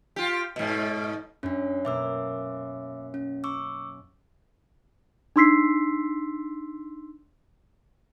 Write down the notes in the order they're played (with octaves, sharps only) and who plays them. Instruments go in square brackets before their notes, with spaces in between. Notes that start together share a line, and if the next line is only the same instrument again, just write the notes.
[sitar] F4 G4
G#2 B2
[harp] F#2 [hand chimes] C#4 D4
[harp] B2 A#3 [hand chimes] E5 D6 E6
[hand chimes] C#4
C#6 D6 E6
[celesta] D4 D#4 C6 E6 B6 C7